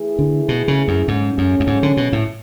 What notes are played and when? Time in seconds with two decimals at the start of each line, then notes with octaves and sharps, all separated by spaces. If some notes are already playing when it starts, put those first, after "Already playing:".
Already playing: E3 A3 E4 G#4
0.19 D3
0.49 B2
0.68 C#3
0.88 F#2
1.08 G#2 C#3 F#3 A3 C#4
1.38 F#2
1.60 F#2
1.67 G#2
1.83 D3
1.97 B2
2.13 A2